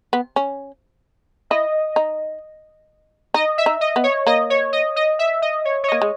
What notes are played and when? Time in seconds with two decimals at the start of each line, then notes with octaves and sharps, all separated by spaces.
0.13 B3
0.36 C#4
1.50 E4 D#5
1.96 D#4
3.34 D#4 D#5
3.58 E5
3.66 D#4
3.81 D#5
3.96 B3
4.04 C#5
4.27 A#3 D#5
4.50 C#5
4.73 D#5
4.96 D#5
5.19 E5
5.42 D#5
5.65 C#5
5.84 C#5
5.88 D#5
5.92 A#3
6.02 G#3